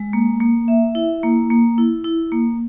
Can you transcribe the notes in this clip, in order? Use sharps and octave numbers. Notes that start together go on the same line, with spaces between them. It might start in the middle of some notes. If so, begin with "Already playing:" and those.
Already playing: G#3
A#3
A#3
E5
E4
A#3
A#3
E4
E4
A#3